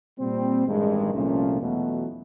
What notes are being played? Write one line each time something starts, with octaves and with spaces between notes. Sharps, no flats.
A#2 G3 C4
A1 G2 D#3 G#3
C2 A#2 F3 A3 C#4
E2 B2 F#3 A3